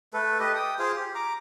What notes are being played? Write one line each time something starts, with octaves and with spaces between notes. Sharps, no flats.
A3 A4 B4
G4 A4 B4 D#5
G5 D#6
F4 G#4 C5 F5
G4
A#5 D6